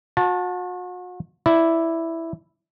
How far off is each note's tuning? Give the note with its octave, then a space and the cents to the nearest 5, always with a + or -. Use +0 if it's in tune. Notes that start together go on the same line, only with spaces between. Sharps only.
F#4 -40 A5 +0
E4 +0 D5 +0